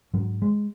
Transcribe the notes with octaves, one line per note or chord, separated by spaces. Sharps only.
G#2 F#3
G#3